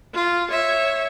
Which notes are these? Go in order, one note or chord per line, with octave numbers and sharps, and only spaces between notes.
F4
C#5 E5